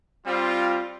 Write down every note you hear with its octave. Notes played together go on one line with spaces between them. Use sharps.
G3 C4 F4